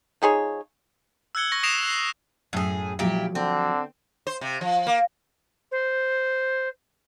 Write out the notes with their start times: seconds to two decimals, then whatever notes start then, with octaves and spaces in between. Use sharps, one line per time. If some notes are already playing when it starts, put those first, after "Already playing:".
0.22 F3 D#4 G#4 C#5
1.35 E6 F#6 G#6 C#7 G7
1.52 C#6 A#6
1.63 D#6 A#6 C7 D7 E7 F7
1.83 F#6 C7
2.53 F#2 A2 G#4
2.99 A#2 F3 F#3 G#3 E4 G4
3.35 D3 C4
4.27 C5
4.41 C3
4.61 F3
4.87 A#3
5.71 C5